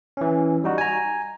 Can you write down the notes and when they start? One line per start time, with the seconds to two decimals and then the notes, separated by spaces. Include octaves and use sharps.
0.17 E3 C#4
0.64 G3 D#4 F#4
0.78 G#5 A#5